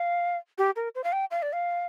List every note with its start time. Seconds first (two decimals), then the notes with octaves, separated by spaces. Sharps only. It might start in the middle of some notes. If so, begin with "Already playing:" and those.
Already playing: F5
0.58 G4
0.76 A#4
0.95 C5
1.04 F5
1.12 G5
1.31 F5
1.42 D5
1.53 F5